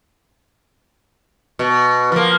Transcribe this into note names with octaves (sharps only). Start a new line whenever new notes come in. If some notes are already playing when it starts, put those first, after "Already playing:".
B2
F3 A#3